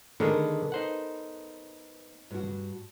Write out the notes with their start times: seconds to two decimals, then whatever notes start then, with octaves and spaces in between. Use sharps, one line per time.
0.20 D3 D#3 G#3 B3 A4 A#4
0.72 D#4 C5 F#5
2.31 G2 F#4